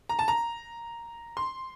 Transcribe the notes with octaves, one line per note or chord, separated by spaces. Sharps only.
A#5
A5
A#5
C6